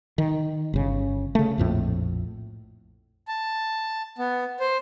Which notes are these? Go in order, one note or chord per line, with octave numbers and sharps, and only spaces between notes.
D#3
G1 C#3
C#3 A3
A#1 F2 A2
A5
B3
C5